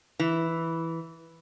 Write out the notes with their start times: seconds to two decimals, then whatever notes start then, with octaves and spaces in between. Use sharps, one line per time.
0.19 E3